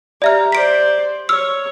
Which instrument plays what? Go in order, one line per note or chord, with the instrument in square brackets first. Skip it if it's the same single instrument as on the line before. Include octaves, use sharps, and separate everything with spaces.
[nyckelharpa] G4 A#5 [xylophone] D5 E5 F6
[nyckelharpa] C5 D5 [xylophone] B6 D7
[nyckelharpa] C#5 [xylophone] E6 F6